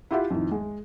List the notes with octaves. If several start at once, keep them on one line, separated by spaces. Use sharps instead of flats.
E4 F4 G4 E5 F#5
F2 A2 D#3
G#3